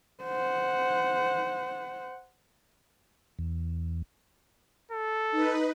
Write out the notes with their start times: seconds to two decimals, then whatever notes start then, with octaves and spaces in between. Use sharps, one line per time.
0.23 C5 F#5
3.39 E2
4.92 A4
5.31 D#4 B4